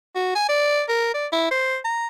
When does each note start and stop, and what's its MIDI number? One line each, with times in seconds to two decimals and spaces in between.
0.15 0.34 66
0.35 0.45 80
0.49 0.82 74
0.89 1.11 70
1.14 1.26 74
1.33 1.46 64
1.51 1.77 72
1.84 2.07 82